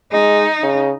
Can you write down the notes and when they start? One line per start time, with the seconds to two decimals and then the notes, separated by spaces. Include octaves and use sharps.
0.12 G#3 D#4
0.63 C#3